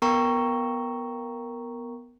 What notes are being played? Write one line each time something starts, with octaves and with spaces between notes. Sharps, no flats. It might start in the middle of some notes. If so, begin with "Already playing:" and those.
B3 A#4 G5 A#5 C#6